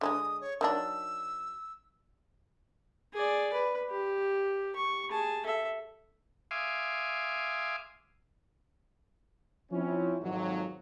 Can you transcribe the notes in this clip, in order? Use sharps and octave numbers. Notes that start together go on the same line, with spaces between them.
D3 G3 G#3 D#6
C#5
D#3 F#3 D4 E6
G#4 D5
B4
G4
C#6
G#4 A5
A4 E5
E5 F5 G#5 C6 D6 D#6
F3 C4 C#4 E4
G#1 F2 G#2 F#3